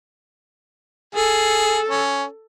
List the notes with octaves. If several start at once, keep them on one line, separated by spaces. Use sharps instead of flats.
G#4 A4
C#4